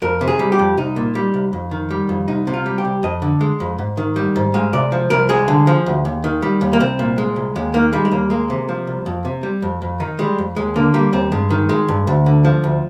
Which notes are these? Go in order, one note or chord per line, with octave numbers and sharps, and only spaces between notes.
F2 A#4
C3
G#4
G3
G4
F2
C2 D#4
A#2
G3
C2
F2
D#3
G3
F2
C2 D#4
C3
F4
G3
G4
C2
F2 D#5
D3
G#3
F2
G#2
D#3
G3
G#2
G#3 F5
C3 D5
F3
C2 A#4
G#3 G#4
D3
F3
D2
D#2
D#3
G3
D#2
A#3
C2 C4
A#2
G#3
C2
D#2 G#3
D#3 A#3
G3 G#3
G#3
D#2 A#3
G#3 A#3
C3
F3
C2
F2
C3
G3
F2
F2
D#3 D#4
G3 G#3
F2
D#2 G#3
D3 A#3
G3 A#3
D#2 C4
G2 G#3
D#3
G#3
G2
D2
D3
F3
D2